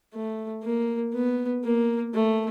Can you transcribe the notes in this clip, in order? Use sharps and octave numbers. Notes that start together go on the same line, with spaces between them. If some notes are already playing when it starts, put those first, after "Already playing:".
A3
A#3
B3
A#3
A3